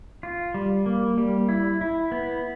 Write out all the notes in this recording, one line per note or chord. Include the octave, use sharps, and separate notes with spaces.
F4
G3
A#3
G3
E4
E4
B3